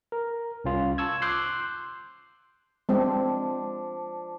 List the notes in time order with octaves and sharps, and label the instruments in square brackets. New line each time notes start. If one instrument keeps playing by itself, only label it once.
[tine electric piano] A#4
C2 C#4 F4
A5 C#6 E6 G#6
C6 D6 E6 F#6 G6 C7
[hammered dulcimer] F3 D4 [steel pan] G#3 C4